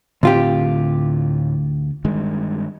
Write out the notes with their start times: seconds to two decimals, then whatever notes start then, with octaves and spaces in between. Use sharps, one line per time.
0.23 D2 A2 C4 F4 G4
2.04 G2 D#3 G#3